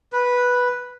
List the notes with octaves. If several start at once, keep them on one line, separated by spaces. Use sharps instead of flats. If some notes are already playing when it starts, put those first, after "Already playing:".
B4